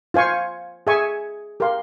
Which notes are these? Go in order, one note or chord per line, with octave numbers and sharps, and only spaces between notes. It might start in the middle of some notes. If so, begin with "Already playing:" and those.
F4 C5 F5 G#5 C#6
G#4 E5 G#5 C#6
G4 A#4 F5 C6